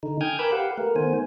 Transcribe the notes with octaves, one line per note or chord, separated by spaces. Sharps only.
D3 D#4
G5 G#5 D#6 F6 G6 G#6
A#4 B4 B5 D6 E6 G6
G4 B4 F5 F#5
A3 A#4
D#3 A3 B3 C5 G#5